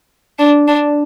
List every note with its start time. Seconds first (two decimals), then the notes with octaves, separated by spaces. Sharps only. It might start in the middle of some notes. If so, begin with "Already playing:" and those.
0.39 D4
0.68 D4